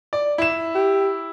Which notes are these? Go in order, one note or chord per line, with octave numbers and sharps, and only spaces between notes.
D5
E4 E7
G4